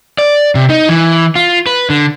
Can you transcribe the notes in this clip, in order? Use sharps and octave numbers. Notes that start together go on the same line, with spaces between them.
D5
C3
D#4
E3
F4
B4
D3